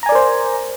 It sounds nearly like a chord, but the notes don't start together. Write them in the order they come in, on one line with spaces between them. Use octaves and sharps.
A#5 G#5 D5 A#4 C5